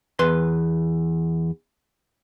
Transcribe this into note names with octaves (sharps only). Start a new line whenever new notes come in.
E2 B4 C6